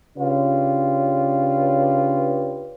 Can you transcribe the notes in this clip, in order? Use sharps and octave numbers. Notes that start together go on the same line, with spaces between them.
C#3 D4 F4 G4 B4 C#5